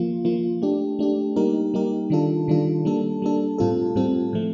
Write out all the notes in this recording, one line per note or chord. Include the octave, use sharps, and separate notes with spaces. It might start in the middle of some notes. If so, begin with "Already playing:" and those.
Already playing: F3 A#3 F4
F3 A#3 F4
A3 D4 G4
A3 D4 G4
G3 A#3 D#4 G4 A#4
G3 A#3 D#4 G4 A#4
D#3 G3 D4 F4 A4
D#3 G3 D4 F4 A4
G3 A#3 D4 A4
G3 A#3 D4 A4
A2 G3 C4 F4 A4
A2 G3 C4 F4 A4
A2 F3 A3